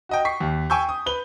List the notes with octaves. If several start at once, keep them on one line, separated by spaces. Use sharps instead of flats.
F#4 D#5 G5
C#6 B6 C7
D#2
G5 G#5 C#6 E6 G6
D#6
B4 G7